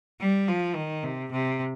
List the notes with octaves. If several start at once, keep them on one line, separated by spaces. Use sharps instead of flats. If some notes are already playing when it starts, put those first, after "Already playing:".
G3
F3
D#3
C3
C3